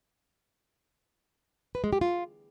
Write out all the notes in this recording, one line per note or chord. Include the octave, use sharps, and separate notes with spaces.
B4
G#3
G4
F4